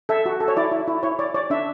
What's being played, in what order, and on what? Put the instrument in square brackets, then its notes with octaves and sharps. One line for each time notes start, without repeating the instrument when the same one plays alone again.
[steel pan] A4 E5
F#4
A4
C#5
E4 D5
E4
E4
E4 C#5
C#5 D5
C#5 D5
D4 E5